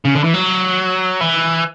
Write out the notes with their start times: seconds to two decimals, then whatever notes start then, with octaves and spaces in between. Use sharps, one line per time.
0.05 C#3
0.15 D3
0.24 E3
0.34 F#3
1.21 E3